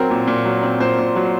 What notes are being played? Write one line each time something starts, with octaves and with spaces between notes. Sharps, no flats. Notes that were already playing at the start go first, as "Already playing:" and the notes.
Already playing: F#3 C4 A#4
A#2
A#2
F#3
C4
A#2 C5
A#2
F#3